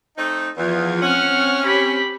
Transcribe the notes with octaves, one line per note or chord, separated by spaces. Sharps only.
A3 C4 D#4
E2 F3 F4 G#6
C4 C#4 F#5 F6
G4 B5